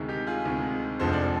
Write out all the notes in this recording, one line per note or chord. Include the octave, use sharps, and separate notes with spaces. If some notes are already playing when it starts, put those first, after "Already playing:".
Already playing: D2 C3 D#3 G#3
D#4 G4
F4 G#4
D2 C3 D#3 G#3
F1 F2 D3 F3 G#3 C5
D5